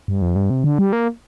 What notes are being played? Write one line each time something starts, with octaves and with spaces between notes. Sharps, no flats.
G2
F2
G2
C3
D3
G3
A#3